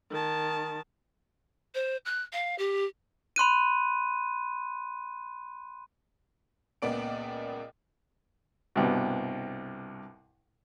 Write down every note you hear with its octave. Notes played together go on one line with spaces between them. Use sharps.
D#3 A5
C5
F#6
F5
G4
B5 C6 F#6 D#7
C#2 A#2 B3 D5 D7
C2 G2 B2